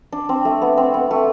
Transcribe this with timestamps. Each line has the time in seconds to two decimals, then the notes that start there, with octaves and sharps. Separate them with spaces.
0.12 D4
0.29 C4
0.45 A3
0.62 B3
0.77 C4
0.94 B3
1.11 A3